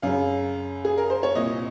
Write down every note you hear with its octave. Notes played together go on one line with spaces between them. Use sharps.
F#2 C#3 F5
G#4
A#4
C5
C#5
C2 A#2 D#5